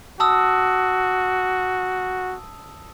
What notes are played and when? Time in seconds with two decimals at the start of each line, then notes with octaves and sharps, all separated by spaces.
0.20 F#4 A5 D#6 E6